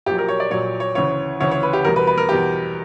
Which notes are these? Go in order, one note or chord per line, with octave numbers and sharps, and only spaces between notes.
A#1 A#2 F#3 G4
A#4
C#5
D5
A#1 A#2 F#3 C#5
C#5
D2 C#3 E3 C#5
D2 C#3 E3 C#5
C#5
B4
G4
E2 B2 G3 A#4
B4
B4
A#4
E2 B2 G3 G4